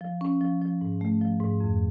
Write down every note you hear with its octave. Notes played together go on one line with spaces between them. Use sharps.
F3
C#4
F3
F3
G#2
A3
F3
G#2
F2